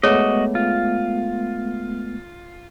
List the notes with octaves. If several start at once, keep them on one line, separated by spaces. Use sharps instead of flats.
G#3 A3 B3 F#4 G#4 C#5 D#5
F4